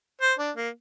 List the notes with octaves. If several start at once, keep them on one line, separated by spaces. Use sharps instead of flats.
C5
D4
A#3